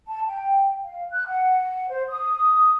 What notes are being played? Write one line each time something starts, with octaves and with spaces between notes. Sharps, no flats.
A5
G5
F5
F#6
F#5
C5
D#6